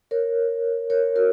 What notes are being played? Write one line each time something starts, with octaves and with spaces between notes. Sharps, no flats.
A#4 C#5
A#4 C#5
F#4 A#4